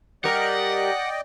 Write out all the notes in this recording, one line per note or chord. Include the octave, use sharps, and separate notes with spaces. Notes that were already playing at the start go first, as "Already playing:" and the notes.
G3 A#4 D5 D#5 F#5 G5